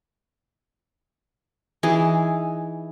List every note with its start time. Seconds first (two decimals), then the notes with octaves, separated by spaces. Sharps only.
1.83 E3 D#4 G#4